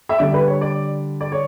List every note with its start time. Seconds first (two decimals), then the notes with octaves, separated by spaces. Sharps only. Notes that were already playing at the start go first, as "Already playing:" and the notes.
0.09 E5
0.19 D3 G3 D5
0.34 B4
0.47 C#5
0.61 D5
1.21 D5
1.32 C#5